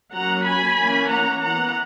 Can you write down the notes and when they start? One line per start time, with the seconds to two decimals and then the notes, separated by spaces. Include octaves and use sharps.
0.13 F#3 A#3 C#4 F#5 A#5
0.46 G#5 B5
0.78 E3 A#3 C#4
1.11 F#5 A#5
1.43 E3 B3 F#5 A#5